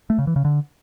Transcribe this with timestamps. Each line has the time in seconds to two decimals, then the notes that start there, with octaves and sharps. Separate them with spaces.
0.10 A3
0.18 C#3
0.27 E3
0.36 C#3
0.45 D3